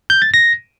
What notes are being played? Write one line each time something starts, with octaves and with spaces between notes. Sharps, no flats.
G6
A6
A#6